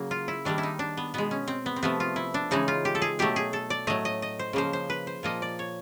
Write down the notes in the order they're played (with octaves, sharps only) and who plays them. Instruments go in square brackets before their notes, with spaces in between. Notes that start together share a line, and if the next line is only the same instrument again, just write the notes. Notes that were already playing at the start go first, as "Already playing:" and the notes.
Already playing: [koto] C#3 F#3 A#3
F4
E4
D#3 G3 A#3 D4
E4
D#4
D4
B3
B2 G#3 B3
C#4
C4
B3
C4
C3 F3 A3 B3
F4
E4
D4
C#3 E3 G#3 D#4
F4
G4
A4
G#4
B2 F#3 A3 G4
G#4
A4
D5
A2 F#3 A3 D#5
D#5
D#5
C5
C#3 F3 A#3 C5
C5
B4
C5
A#2 F3 A#3 D#5
D5
C#5